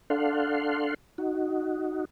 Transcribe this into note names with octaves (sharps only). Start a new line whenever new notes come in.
D4 A4 F5 F#5 C6
D#4 F#4